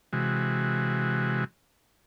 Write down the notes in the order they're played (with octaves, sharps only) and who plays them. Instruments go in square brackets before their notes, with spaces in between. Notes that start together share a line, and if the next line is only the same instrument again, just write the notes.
[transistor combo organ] C3 E3 G#3 F#4